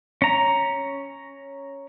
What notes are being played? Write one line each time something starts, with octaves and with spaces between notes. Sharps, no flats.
C#4 A#5